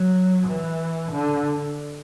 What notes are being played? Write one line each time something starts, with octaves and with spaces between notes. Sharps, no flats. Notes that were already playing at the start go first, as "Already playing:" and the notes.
Already playing: F#3
E3
D3